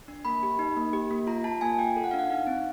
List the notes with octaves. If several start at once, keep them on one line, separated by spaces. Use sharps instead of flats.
D4
A#3 B5
G4
D#4
A#3
G4
A#3
F4 A#5
F4 A5
A#3 G#5
F4 G5
A4
F#5
F5
D4
F#5
D#4 F5
C4